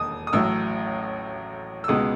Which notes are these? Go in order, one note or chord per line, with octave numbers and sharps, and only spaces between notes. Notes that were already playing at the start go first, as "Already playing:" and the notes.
Already playing: E1 D#2 D#6
D#6
A1 A2 F#3 E6
E6
C#2 B2 G#3 B3 D#6